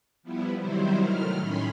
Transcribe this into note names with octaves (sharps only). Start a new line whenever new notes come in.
F3 G3 B3 E4
C3 D#3 F#3 G3 E4 C5
D#3 F#3 A3 F6
A2 D#3 C#4 B5 C6